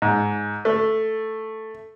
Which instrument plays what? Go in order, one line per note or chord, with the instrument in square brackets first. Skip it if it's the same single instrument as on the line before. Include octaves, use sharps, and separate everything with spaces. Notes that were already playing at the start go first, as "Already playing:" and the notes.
[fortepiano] G#2
A3